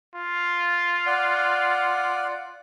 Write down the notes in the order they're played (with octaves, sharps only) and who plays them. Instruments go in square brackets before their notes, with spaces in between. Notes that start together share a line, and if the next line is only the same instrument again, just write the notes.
[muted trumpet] F4
[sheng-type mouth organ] D5 F#5